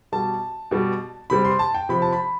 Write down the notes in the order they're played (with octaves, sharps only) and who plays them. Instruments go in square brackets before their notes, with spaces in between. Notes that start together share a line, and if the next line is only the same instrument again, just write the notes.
[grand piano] B2 G3 A5
B2 G3
C3 G3 B5
C6
A5
G5
C3 F3 B5
A5
B5